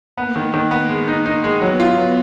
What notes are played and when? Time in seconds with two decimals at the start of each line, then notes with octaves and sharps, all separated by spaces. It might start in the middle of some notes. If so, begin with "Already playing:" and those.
0.17 A#3 B3
0.36 D#3
0.54 D#3
0.71 B3
0.89 G#3
1.07 D#4
1.26 D#4
1.44 G#3
1.61 F#3 B3
1.80 F4
1.97 F#3